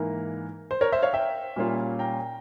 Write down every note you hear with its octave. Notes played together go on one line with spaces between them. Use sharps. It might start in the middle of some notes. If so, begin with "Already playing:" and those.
Already playing: G#2 E3 A#3 A#4
C5
A#4 C#5
C5 E5
C#5 F5
E5 G5
A#2 G3 A#3 C#4 F4
G5 A#5